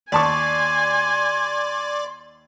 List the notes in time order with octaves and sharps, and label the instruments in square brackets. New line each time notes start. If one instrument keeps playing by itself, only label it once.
[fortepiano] D#2 A5 C#6 [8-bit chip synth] D5 [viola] G#5 [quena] C6